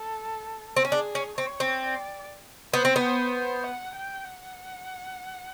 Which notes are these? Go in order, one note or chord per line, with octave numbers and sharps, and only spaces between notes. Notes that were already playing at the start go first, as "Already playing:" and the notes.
Already playing: A4
C4
C#4
D4 G#4
C#4
C4 C#5
C4
D5
B3 C5
C4
B3
C5
C5
F#5
G5
F#5